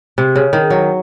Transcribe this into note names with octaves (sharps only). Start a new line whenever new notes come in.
C3
C#3
D#3
F#3